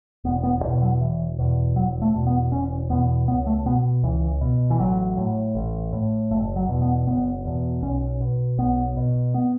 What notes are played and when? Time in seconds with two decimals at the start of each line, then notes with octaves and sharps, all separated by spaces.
0.24 E1 B3
0.43 B3
0.63 E2 B2
0.82 F#3
1.01 E1 E3
1.39 E2 B2
1.76 E1 F#3
2.02 A3
2.14 E2 B2
2.27 B3
2.52 E1 C#4
2.89 E2 B2 B3
3.27 C#2 B3
3.46 A3
3.65 B2 B3
4.03 C#2 E3
4.41 B2
4.70 E3
4.79 A1 F#3
5.17 A2
5.55 A1
5.93 A2
6.31 F#1 A3
6.56 F#3
6.69 E2 B2
6.82 B3
7.07 F#1 B3
7.45 E2 B2
7.82 B1 C#4
8.20 B2
8.58 B1 B3
8.96 B2
9.34 B3